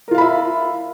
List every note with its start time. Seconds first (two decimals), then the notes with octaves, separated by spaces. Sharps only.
0.08 A#4
0.11 F4
0.15 F5
0.18 B5
0.21 E5